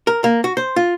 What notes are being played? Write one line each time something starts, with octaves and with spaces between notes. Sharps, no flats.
A#4
A#3
F#4
C5
F4